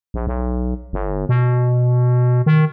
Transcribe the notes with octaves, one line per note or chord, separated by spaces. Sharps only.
A#1
B1
G1
B2
D#3